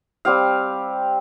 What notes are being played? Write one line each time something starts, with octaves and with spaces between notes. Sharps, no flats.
G3 C4 G4 F5